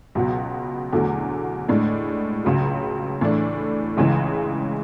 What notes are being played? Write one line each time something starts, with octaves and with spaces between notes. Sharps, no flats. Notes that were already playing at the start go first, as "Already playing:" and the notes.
C#2 B2 F#3
E2 D3 F#3 A3
A2 G#3 D4
C#2 C#3 F#3
A2 E3 A3 D4
C#2 C#3 E3 G#3